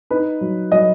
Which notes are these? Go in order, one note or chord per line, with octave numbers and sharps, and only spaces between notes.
D#4 B4
F#3
F#3 D#5